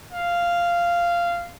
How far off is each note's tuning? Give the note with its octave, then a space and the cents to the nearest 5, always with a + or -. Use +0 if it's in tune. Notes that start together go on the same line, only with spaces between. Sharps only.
F5 -10